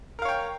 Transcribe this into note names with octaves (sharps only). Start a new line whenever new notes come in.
A#4 C#5 F5 G5